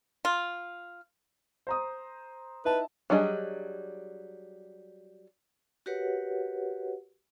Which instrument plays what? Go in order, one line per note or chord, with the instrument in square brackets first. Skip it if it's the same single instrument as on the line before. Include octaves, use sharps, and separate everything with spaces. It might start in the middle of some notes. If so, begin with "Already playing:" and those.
[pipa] F4
[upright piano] C5 A#5 D#6
[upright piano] D#4 E4 A5 [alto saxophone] B4
[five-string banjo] F#3 G3 D4 G#4 D#5
[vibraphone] F#4 G4 A#4 B4 C#5 F#5